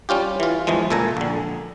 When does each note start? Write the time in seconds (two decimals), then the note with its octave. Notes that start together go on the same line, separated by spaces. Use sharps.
0.09 G3 C#4 F4 G4
0.40 E3 F4
0.67 G1 E2 E3 F3 G#3
0.90 C#2 A#2 A4 G#5 A#5
1.17 A#1 D3